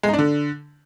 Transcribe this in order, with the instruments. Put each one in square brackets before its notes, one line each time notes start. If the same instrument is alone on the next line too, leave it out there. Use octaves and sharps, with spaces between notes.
[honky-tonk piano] G#3
D#4
D4
D3